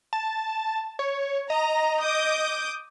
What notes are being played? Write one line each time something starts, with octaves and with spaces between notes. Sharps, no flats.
A5
C#5
D#5 A#5
D6 D#6 G6